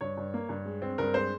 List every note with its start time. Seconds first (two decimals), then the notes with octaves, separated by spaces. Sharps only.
0.01 G2 C#5
0.17 G2
0.34 A#3
0.49 G2
0.65 G#3
0.82 C4
0.98 G2 A#4
1.14 G#3 C5